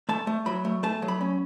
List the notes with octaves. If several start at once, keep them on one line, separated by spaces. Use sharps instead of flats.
A3 A5
A3
F#3 B5
A3
A3 A5
F#3
B5
C#4